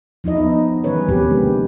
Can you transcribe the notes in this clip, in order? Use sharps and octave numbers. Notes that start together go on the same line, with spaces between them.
F3 D#4 E4 D#5
B3 D#4
D#3 E3 G3 C#4 B4 C#5
C3 F3 B3 C4 G4 B4
D3 G#3 A#3